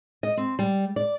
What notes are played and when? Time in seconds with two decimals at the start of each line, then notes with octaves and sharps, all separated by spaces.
0.23 D#5
0.37 C4
0.59 G3
0.96 D5